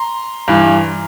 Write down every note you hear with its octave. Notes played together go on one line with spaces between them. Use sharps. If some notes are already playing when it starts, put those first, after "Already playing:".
Already playing: A#5 C6
G2 E3